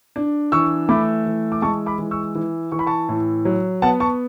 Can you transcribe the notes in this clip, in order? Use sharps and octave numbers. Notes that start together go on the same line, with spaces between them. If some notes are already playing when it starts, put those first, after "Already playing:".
D4
E3 C#6 E6
A3 B5 D6
E3
D6
G#3 A5 C#6
B5 D6
E3
C#6 E6
E3
E3 C#6
B5
A5 C#6
A2
F#3
B3 F#5 A5
A5 C#6